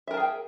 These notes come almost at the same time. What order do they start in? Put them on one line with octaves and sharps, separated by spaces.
E5 A#4 A5 G#4 G5